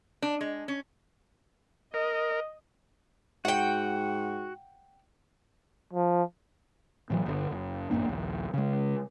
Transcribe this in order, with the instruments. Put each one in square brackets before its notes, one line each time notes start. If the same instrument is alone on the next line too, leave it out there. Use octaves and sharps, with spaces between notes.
[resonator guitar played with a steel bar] D4
G#3
C#4
[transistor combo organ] A#4 [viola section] D#5
[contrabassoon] G#2 [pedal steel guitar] F#4 [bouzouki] F#5 G5
[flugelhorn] F3
[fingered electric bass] A2 E3 F#3
G1 B2 D3
F#1
A1 F#2 A#3 D4
A#1 D#2
C#3 G#3